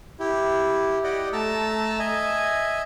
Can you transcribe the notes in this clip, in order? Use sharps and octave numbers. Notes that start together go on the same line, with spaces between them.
E4 G4
G4 D5 D#5 F#5
A3 A5 A#5 E6
D#5 E5 G#5